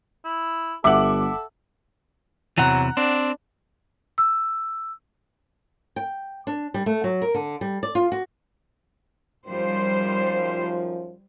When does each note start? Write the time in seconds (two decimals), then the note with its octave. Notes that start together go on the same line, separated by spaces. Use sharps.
0.24 E4
0.84 G1 A4 E5 F#5 D6 F#7
2.58 E2 C3 E3 F#3 F#5 A#5
2.97 C4 D4
4.18 E6
5.96 G5
6.47 D4
6.74 G3
6.86 A3
7.04 F#3
7.22 A#4
7.35 D3
7.61 G3
7.83 D5
7.95 F4
8.12 F#4
9.47 F#2 D#3 F3 G3 C5